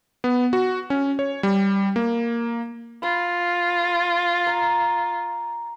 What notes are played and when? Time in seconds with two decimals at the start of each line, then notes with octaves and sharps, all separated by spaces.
0.24 B3
0.53 F#4
0.90 C#4
1.19 C#5
1.43 G3
1.96 A#3
3.03 F4 B5
4.47 A#5